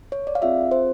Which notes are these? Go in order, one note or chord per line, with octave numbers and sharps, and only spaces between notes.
C#5
D5
F5
C4 F4 G#4 E5
C5